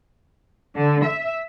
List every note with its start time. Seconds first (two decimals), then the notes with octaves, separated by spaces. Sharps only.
0.75 D3
1.05 E5